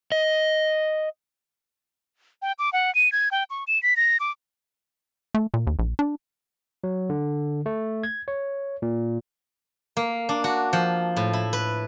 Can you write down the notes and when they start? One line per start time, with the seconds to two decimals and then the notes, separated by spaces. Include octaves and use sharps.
0.12 D#5
2.42 G5
2.59 D6
2.73 F#5
2.95 D#7
3.12 G#6
3.31 G5
3.50 C#6
3.67 E7
3.83 B6
3.97 A#6
4.20 D6
5.35 A3
5.54 A#2
5.67 D#2
5.79 A#1
5.99 D4
6.84 F#3
7.10 D3
7.66 A3
8.03 G#6
8.28 C#5
8.82 A#2
9.97 A#3
10.29 D4
10.44 F#4
10.73 F3
11.16 A2
11.33 E4
11.53 B4